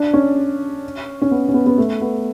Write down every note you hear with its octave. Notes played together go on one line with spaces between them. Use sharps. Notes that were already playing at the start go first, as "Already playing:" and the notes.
Already playing: D4
C#4
C#4
B3
C#4
B3
B3
A3
B3